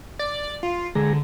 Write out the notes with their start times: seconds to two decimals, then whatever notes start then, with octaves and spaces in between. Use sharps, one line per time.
0.19 D5
0.63 F4
0.95 D3 G#3 G#4 A#5